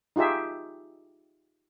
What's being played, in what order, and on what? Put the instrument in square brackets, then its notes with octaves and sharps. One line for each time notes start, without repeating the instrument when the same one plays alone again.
[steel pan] D#4 F4 G4 G#4 E5